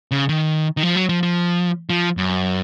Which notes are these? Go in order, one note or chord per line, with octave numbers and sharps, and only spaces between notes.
C#3
D#3
D#3
F3
F#3
F3
F3
F3
F#2